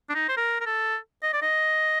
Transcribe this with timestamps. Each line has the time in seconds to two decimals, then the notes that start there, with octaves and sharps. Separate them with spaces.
0.09 D4
0.15 D#4
0.28 C5
0.37 A#4
0.60 A#4
0.66 A4
1.23 D#5
1.33 D5
1.42 D#5